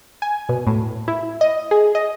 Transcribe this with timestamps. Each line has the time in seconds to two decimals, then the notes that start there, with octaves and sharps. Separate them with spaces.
0.22 G#5
0.49 B2
0.67 A2
1.08 E4
1.41 D#5
1.71 G#4
1.95 D#5